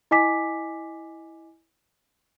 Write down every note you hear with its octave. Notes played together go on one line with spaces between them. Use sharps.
E4 D#5 G#5 D6 B6